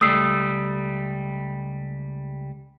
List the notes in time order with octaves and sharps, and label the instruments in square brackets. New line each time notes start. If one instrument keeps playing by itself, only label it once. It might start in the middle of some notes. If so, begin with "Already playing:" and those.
[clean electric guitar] C#2 G3 A3 [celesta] D#6 E6 C7